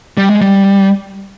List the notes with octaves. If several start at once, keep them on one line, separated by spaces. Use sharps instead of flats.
G3
G#3
G3